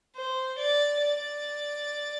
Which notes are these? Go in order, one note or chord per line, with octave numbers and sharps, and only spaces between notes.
C5
D5
D5